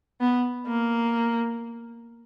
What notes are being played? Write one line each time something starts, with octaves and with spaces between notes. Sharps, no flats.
B3
A#3